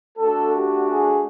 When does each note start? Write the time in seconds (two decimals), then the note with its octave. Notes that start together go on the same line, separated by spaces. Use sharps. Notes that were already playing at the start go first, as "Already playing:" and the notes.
0.17 A3 D4 F#4 A4
0.52 G4
0.87 G#4